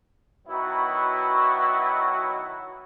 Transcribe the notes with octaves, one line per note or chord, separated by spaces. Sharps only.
B2 D#3 F#3 B3 E4 F#4